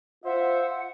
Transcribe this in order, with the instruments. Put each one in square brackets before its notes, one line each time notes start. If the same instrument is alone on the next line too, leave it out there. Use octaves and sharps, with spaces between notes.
[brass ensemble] F4 C5 E5 [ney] F#5